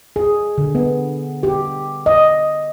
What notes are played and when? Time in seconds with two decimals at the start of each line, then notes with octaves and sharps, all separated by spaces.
0.16 G#4
0.58 D3
0.75 B3
1.43 G4
2.06 D#5